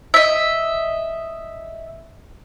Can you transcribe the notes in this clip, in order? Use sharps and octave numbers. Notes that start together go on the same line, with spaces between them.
D#5 E5